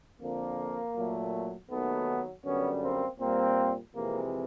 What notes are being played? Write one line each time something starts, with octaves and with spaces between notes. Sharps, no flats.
F2 D3 F3 A#3
A#2 F#3 A3
D#2 D#3 F#3 A3 B3
F#2 D3 G3 B3 C#4
A#3 C4
A#2 G3 A#3 C4
F2 C3 E3 G#3 A#3